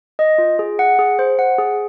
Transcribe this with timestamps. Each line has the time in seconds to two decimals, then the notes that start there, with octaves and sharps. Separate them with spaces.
0.19 D#5
0.38 F4
0.59 G#4
0.79 F#5
0.99 G#4
1.19 C5
1.39 F#5
1.59 G#4